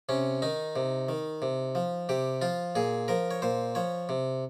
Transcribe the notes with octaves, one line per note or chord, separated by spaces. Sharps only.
C3 C#4
D#3 D#4
C3
D#3
C3
F3
C3 G4
F3 F4
A#2 G#4
F3 A#4
C#5
A#2 C5
F3 C#5
C3